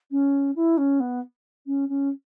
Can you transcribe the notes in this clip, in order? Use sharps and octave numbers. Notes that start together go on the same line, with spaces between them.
C#4
E4
C#4
B3
C#4
C#4